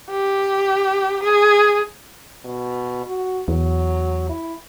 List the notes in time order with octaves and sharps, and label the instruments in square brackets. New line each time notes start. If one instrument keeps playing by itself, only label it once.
[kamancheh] G4
G#4
[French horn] B2
F#4
[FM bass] E2 [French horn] F#3
[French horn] E4